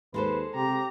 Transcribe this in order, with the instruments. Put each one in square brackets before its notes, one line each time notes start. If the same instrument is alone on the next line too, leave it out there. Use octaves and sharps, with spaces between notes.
[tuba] D#2 [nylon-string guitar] G#3 A4 C5 [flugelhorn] B4
[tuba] C3 [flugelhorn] G4 [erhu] A#5